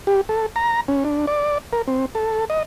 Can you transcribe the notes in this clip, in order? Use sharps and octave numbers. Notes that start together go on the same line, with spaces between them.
G4
A4
A#5
C#4
D4
D5
A#4
C4
A4
D#5